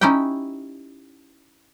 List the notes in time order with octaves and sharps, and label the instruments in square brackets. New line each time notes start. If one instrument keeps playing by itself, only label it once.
[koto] C#4 D#4 E4 G4 G5